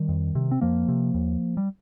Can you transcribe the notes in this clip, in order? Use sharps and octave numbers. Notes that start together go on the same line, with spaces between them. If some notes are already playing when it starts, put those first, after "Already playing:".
Already playing: D#3 G3
F2
C3
C4
F2 F3 A#3
C3
D#2
G3